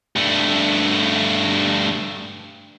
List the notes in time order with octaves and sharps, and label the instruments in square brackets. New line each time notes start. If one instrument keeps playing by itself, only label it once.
[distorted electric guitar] G2 A3